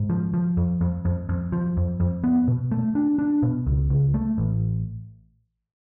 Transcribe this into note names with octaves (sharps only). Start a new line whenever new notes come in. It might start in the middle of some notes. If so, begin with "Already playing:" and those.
Already playing: G#2
F3
F3
F2
F2
F2
F2
F3
F2
F2
B3
B2
A3
D4
D4
B2
C#2
C#2
A3
A1